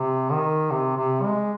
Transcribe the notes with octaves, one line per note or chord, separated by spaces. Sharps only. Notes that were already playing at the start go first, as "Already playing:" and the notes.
Already playing: C3
D#3
C3
C3
G#3